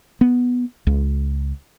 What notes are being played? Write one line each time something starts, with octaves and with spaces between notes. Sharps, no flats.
B3
C#2